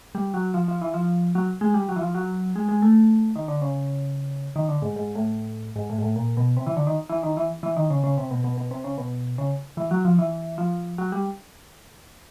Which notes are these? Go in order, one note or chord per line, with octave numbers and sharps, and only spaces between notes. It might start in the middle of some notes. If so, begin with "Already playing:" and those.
G3
F#3
F3
F3
E3
F3
F#3
G#3
G3
F#3
E3
F3
F#3
G#3
G#3
A3
D#3
D3
C#3
D#3
D3
G#2
G#2
A2
G#2
A2
G#2
A2
A#2
B2
C3
E3
D3
D#3
E3
D#3
E3
E3
D#3
C#3
C#3
C3
B2
B2
B2
C3
C#3
B2
C#3
E3
F#3
F3
E3
F3
F#3
G3